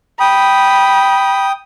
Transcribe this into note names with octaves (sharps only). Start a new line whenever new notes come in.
G5 B5 D#6